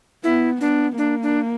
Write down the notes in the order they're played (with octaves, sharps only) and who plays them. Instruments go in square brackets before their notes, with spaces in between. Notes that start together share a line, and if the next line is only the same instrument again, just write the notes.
[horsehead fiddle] B3 [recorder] E4
[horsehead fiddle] B3 [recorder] D4
[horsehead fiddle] A#3 [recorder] D4
[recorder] D4